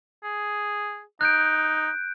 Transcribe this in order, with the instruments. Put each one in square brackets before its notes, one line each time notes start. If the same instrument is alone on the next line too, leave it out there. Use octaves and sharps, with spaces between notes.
[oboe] G#4
[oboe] D#4 [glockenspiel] F#6 G6 D7